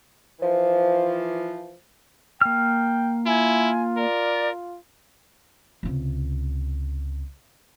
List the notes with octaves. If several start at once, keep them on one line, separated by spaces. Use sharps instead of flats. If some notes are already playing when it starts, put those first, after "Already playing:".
E3 F3
A#3 G5 F6
E4 F4 G#5
A#4 D5
C#2 C3